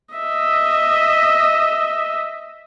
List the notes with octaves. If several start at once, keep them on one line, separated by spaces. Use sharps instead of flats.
D#5 E5